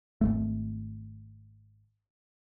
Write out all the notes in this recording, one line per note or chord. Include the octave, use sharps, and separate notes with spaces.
G#1 E2 A3